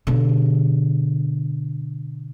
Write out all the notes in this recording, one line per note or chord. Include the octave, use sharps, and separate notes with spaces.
B2 D3